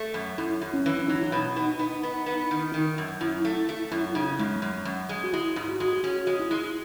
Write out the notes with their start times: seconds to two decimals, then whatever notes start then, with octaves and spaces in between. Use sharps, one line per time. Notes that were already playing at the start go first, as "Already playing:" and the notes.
Already playing: A3
0.14 F#2
0.38 F#2 E4
0.62 F#2
0.74 C#4
0.86 E3
1.08 F#3 D#4
1.15 E4
1.24 D#4
1.32 B2
1.56 B3 D#4
1.79 B3
2.03 B3
2.26 B3
2.51 D#3
2.74 D#3
2.98 F#2
3.21 F#2 E4
3.45 A3
3.69 A3
3.91 F#2 E4
4.09 E4
4.15 C#3 D#4
4.39 F#2 G#3
4.62 F#2
4.85 F#2
5.09 G#3
5.24 F#4
5.33 G#3 E4
5.56 G#2
5.68 F#4
5.80 G#3
6.03 C#4 F#4
6.27 G#3
6.40 E4
6.51 G#3